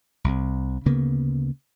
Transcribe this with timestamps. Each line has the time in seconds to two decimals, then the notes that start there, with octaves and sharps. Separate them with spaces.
0.24 C2 C3
0.86 D2 C#3 A#3 B3